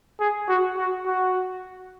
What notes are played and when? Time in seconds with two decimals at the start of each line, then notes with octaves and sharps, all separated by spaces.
0.20 G#4
0.48 F#4
0.77 F#4
1.06 F#4